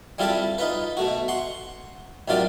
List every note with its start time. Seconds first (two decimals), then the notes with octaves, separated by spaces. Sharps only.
0.18 G3 C4 E4 F4 G4 A4
0.58 D#4 F4 B4
0.97 B2 A3 F#4
1.28 F#5 C6 C#6
2.28 A1 C3 D#3 F#3 F4 D5